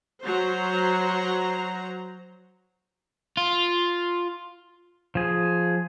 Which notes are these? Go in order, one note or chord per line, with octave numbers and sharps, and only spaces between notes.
F#3 C5 A#5
F4
F3 G#4